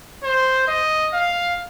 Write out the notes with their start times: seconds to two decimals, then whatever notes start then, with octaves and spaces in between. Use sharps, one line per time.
0.23 C5
0.68 D#5
1.14 F5